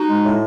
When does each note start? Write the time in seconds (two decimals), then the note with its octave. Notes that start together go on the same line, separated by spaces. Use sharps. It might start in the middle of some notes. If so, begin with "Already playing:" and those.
Already playing: D#4 F#4
0.08 G#3
0.24 A2